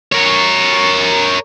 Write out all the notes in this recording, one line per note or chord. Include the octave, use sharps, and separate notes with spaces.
A#4 C#5